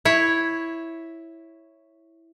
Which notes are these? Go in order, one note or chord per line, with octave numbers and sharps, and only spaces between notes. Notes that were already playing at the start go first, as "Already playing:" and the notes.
E4 C#5